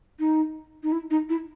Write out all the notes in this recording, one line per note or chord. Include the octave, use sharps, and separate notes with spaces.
D#4
D#4
E4
D#4
E4